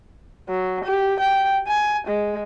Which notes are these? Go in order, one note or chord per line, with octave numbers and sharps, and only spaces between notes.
F#3
G4
G5
G#5
G#3